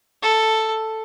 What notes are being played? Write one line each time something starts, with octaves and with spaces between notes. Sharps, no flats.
A4